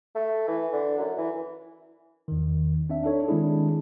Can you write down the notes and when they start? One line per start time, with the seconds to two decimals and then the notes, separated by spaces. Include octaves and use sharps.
0.15 A3
0.48 E3
0.72 D3
0.98 F#2
1.18 E3
2.28 E2 D#3
2.90 C4 D4 E5
3.03 D4 D#4 A4 C#5
3.28 D#3 G#3 C4 D4 E4 G#4